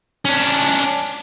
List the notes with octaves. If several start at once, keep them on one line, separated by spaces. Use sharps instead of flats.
C#4 D4